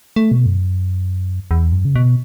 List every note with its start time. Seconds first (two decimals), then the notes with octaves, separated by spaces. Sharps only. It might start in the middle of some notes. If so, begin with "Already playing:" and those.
0.16 A3
0.32 B2
0.46 F#2
1.51 E2
1.72 F#2
1.85 C#3
1.96 B2